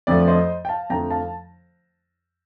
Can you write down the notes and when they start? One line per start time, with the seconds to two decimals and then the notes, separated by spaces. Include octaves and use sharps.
0.07 F2 D3 F3 A3 D5
0.28 C5 D#5
0.65 G5
0.69 F5 A5
0.90 F2 D3 F3 A3 G5 A#5
1.11 F5 A5